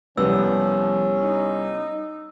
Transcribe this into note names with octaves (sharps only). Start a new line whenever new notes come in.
C2 F3 G3 B3 C#4 E6
D#4